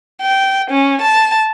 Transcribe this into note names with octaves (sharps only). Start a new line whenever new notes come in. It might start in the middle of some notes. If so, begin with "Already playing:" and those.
G5
C#4
A5